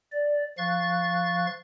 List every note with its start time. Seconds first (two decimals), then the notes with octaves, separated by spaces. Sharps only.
0.12 D5
0.58 F3 F5 C#6 F#6 A6